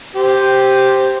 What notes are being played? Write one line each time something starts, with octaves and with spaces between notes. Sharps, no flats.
G4 C5